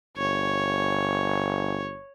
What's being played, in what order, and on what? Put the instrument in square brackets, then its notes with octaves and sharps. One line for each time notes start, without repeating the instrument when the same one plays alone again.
[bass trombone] G1 [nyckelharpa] C#5